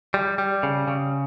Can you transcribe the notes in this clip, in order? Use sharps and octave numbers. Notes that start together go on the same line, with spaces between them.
G3
G3
C#3
C#3